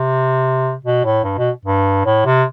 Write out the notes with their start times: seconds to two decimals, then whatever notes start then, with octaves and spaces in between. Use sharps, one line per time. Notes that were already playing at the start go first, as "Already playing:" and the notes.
Already playing: C3
0.85 B2
1.04 A2
1.24 G2
1.38 B2
1.65 G2
2.05 A2
2.25 C3